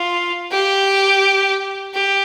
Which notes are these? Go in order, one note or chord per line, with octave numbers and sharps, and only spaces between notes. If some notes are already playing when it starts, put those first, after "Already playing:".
Already playing: F4
G4
G4